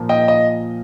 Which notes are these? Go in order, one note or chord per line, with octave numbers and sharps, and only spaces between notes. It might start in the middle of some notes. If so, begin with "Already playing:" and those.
Already playing: A#2 F3 A#3
D#5 G5
D#5